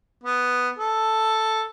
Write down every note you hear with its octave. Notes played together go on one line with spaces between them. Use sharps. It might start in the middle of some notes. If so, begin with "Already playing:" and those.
B3
A4